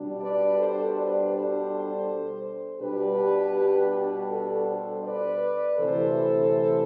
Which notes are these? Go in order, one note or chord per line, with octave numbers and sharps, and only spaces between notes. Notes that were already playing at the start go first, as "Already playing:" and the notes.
Already playing: B2 G3 D4
B4 D5
A4 C5
B4 D5
A4 C5
B2 G3 D4 G4 B4
F#4 A4
A4 C5
B4 D5
D2 C3 E3 A4 C5